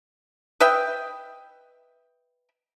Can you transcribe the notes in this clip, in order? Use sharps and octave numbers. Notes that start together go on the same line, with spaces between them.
B4 D#5 E5 G5